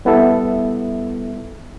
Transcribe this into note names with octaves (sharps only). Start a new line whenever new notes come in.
G3 B3 E4 A4 E5